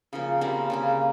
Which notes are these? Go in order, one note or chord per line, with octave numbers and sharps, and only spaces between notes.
C#3 F3 A#3
C#3 G3 A#3 C4
C#3 G3 A#3